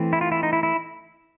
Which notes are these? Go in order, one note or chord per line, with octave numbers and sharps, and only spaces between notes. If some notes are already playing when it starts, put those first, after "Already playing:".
Already playing: E3 A3 C4
E4
F4
E4
D#4
E4
E4